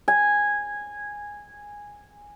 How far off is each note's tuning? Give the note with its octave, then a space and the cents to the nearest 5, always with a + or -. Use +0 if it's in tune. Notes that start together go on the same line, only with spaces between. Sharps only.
G#5 -10